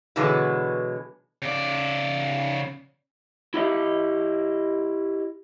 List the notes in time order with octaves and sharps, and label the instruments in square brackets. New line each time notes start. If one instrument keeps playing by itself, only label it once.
[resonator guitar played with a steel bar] B2 D3 E3 F#3 G#3 B3
[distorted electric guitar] C#3 D5
[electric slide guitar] E4 G4 D#5